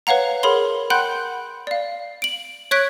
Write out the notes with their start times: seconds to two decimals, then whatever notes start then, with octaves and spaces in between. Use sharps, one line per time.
0.07 B4 C#5 F5 F#5 A#5
0.43 G#4 A#4 C#5 B5 C6
0.90 F#5 G5 B5 C6 F#6 G6
1.67 D5 F5
2.22 D7 F#7
2.71 C#5 C#6 F#6 G#6 B6 D7